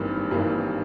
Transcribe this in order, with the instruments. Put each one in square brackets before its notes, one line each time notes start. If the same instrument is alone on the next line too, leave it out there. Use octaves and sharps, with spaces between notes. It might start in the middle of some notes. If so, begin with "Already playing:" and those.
Already playing: [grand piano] G#1 G2 E3 G3 A#3
G#1 G2 E3 G3 A#3